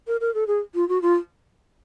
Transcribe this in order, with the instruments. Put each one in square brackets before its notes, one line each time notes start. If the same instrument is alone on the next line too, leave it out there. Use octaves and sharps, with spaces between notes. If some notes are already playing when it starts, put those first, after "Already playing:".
[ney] A#4
A#4
A4
G#4
F4
F#4
F4